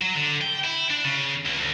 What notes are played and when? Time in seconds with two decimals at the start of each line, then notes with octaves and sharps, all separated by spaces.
0.02 F#3
0.15 D3
0.41 G5
0.64 E4
0.90 D4
1.05 C#3
1.46 C#2
1.60 D2